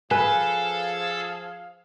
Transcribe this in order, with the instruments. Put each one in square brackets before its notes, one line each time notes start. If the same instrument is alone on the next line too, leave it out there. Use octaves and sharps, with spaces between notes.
[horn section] F3 G#4 F5 [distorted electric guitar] A4 [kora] B4 [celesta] G#5